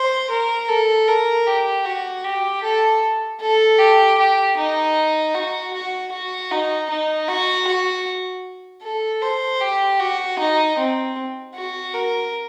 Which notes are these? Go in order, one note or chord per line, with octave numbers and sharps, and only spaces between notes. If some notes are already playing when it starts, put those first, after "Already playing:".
Already playing: C5
A#4
A4
A#4
G4
F#4
G4
A4
A4
G4
G4
D#4
F#4
F#4
F#4
D#4
D#4
F#4
F#4
A4
C5
G4
F#4
D#4
C4
F#4
A#4